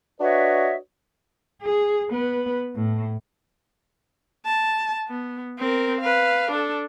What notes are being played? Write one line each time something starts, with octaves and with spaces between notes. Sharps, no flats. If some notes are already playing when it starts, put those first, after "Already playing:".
D4 F#4 B4 C#5 D#5 E5
G#4
B3 B4
A2
A5
B3
C4 A#4
B4 F5
D4 A4